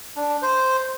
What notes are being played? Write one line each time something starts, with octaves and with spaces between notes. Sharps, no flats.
D4
C5